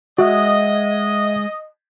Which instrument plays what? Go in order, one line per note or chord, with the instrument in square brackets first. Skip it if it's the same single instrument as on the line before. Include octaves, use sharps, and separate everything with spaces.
[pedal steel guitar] G#3 [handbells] F#4 [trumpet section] D#5 [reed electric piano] E5 F#5